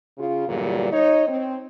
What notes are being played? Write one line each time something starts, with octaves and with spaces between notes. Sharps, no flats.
C#3 F4
E2 G2 A#2 D3 F#3 G3
D#4 C#5 D#5
C4